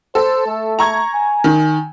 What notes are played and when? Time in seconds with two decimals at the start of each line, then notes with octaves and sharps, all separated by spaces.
0.15 A4 C5
0.46 A3
0.79 A#5 C#6 G#6
1.14 G#5
1.44 D#3